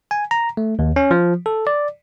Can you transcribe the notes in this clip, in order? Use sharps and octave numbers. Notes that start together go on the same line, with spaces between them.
G#5
A#5
A3
D#2
C#4
F3
A4
D5